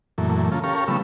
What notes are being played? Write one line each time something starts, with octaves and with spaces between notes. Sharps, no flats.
F#2 A#2 E3 A3
C#3 A#3 F4 A4
C#4 G4 A4 A#4 F5 C#6
C#3 F3 G3 A3 B3 E6